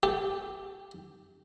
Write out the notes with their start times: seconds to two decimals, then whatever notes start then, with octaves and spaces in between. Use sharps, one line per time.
0.03 G4